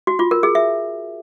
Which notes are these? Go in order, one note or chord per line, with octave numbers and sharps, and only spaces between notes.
F#4
F4
A#4
G#4
E5